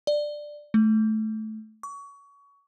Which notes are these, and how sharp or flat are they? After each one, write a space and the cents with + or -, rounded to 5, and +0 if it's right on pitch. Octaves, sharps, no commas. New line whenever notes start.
D5 +10
A3 -15
C#6 +25